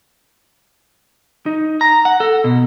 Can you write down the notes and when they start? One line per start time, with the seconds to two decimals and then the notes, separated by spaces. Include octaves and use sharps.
1.46 D#4
1.81 A#5
2.05 F#5
2.20 A4
2.44 B2